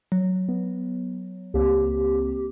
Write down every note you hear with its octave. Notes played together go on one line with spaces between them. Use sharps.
F#3
B3
C#2 A#3 C4 G4